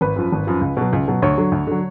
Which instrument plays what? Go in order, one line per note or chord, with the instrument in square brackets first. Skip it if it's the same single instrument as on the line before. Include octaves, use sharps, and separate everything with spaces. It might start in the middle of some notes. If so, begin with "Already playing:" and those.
[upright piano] G#1 B4
F#2 F3
G#1
F#2 F3
C#2
B2 F#3
C#2
B2 F#3
D2 C#5
D3 F#3
D2
D3 F#3